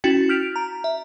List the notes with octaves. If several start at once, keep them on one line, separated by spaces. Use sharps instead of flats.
C#4 E4 F#4 G5 A6
F6 G6 B6 D7 F7
A#5
E5